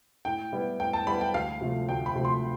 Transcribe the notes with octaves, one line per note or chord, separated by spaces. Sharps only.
A2 G5
G3 B3 E4
A2 G5
A5
G3 B3 E4 B5
G5
D2 F5
C3 F3 A3
D2 G5
B5
C3 F3 A3
C6